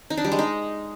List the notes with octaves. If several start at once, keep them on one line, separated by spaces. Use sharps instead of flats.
D#4
D4
G3
G#3
D#4